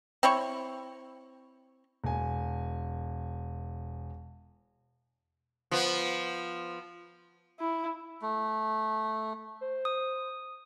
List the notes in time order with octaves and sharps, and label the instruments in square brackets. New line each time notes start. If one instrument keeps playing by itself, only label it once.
[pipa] C4 E4 C#5 C#6
[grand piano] E1 G#5
[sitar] F3 B3
[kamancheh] E4
[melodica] A3
[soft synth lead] C5
[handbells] D#6